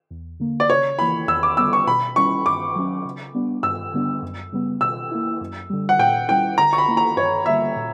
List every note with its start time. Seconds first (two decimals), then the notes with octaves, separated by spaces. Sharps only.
0.11 E2
0.40 D3 A#3
0.60 D5
0.70 C#3 C#5
0.99 E3 A#3 E4 B5
1.28 E2 E6
1.43 D6
1.57 D3 G3 B3 E6
1.73 C#6
1.87 B2 B5
2.16 G3 C#4 E4 C#6
2.46 G2 D6
2.76 F#3 C#4
3.05 C#3
3.35 G3 B3 D4
3.63 G2 E6
3.94 D3 G3 B3 D4
4.22 F#2
4.52 C#3 G3 B3
4.81 B2 E6
5.11 A#3 E4
5.41 F#2
5.70 D3 G3
5.89 F#5
5.99 A#2 G5
6.29 G3 C#4 E4 G5
6.58 D3 A#5
6.73 C#6
6.78 B5
6.88 A#3 E4
6.97 A#5
7.16 G2 C#5
7.46 D3 G3 A#3 E5
7.76 A#2